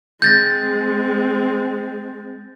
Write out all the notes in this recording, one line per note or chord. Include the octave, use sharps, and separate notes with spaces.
G#3 C4 G6 A6 A#6